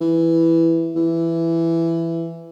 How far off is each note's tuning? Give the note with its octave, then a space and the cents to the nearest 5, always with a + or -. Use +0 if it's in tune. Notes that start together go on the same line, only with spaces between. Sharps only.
E3 +0
E3 +10